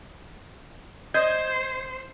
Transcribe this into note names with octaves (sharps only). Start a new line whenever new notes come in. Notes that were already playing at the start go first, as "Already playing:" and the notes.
C5 D#5 G6 G#6